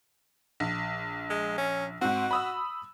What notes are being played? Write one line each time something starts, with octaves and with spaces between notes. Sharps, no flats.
A#1
G#3
C#4
G#2 C4 F#4
B5 D#6 E6